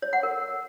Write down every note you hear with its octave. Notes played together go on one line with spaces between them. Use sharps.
C#5
F#5
A#4